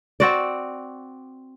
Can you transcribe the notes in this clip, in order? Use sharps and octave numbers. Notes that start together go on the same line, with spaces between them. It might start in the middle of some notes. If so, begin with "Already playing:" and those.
C4 F#4 D5